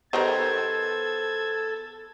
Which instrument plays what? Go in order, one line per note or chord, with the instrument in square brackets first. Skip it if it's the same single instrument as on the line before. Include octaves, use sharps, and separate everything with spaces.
[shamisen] D#3 G4 A#4 [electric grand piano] B3 C5 [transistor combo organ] A4 [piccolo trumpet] G#6